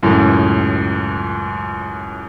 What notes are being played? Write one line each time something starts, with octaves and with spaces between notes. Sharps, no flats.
C#2 F#2 A2